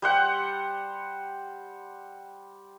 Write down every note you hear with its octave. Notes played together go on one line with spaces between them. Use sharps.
G3 C5 F#5